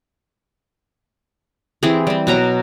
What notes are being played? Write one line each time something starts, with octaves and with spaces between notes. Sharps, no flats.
E3 C4 G4 G#4
G3 C4
B2 F#3 A#5